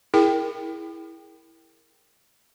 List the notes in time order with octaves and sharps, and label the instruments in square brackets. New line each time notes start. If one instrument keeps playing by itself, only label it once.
[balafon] E4 G#4 A#4 G5